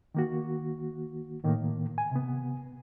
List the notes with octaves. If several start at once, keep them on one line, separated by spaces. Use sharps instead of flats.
D#3 A#3 F#4
A2 D#3 A#3
G#5
C3 B3